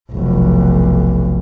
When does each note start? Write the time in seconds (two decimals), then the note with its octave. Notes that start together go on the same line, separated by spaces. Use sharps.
0.12 F1 B1